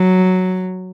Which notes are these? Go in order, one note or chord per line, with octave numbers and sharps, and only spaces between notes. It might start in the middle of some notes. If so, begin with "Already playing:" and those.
Already playing: F#3